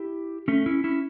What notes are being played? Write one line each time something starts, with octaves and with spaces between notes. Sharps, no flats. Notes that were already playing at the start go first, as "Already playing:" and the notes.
Already playing: E4 G4
A3 C#4
C#4 E4
C#4 E4